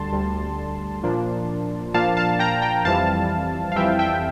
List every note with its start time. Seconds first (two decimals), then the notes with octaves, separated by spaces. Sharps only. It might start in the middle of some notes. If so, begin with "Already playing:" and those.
Already playing: D2 D3 G3 A5 C6
0.12 D2 D3 G3
1.03 A#2 F3 A#3 D4
1.94 A#2 F3 A#3 D4 F5 A5
2.17 F5 A5
2.39 G5 A#5
2.62 G5 A#5
2.85 F2 E3 G3 C4 E4 F5 A5
3.72 F5
3.76 F2 E3 G3 C4 E4 E5 G5
3.99 E5 G5